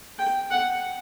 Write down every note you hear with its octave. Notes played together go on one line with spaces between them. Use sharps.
G5
F#5